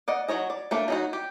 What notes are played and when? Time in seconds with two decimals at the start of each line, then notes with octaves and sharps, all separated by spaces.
0.08 D5 D#5 F#5
0.28 F#3 F#4 C#5 D#5
0.50 D5
0.71 A3 A#3 D4
0.88 F#3 D#4 F#4
1.13 G4